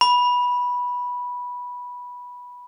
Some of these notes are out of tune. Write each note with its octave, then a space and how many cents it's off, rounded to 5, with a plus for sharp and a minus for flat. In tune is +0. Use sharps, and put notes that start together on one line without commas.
B5 -10